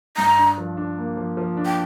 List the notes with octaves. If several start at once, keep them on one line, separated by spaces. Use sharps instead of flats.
G2 A#5
D4
F3
D4
A#3
F3
F3
D4
G5